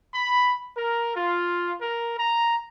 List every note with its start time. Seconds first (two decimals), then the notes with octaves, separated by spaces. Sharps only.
0.15 B5
0.78 A#4
1.16 F4
1.82 A#4
2.19 A#5